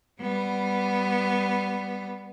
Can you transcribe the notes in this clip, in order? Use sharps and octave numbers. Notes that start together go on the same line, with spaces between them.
G3 B3